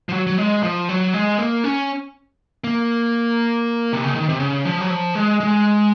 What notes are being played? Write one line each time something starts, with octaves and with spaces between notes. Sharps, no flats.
F3
F#3
F#3
G#3
F3
F#3
G#3
A#3
C#4
A#3
C3
C#3
D#3
C3
C#3
F3
F#3
F3
G#3
G#3